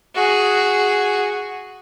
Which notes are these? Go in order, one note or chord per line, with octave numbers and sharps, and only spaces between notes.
F#4 G#4